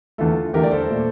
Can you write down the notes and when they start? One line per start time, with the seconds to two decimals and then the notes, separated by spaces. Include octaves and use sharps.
0.18 E2 D3 A3 F4 A4
0.54 E2 D3 A3 G4 A#4
0.63 D5
0.71 A4 C5
0.90 A#2 A3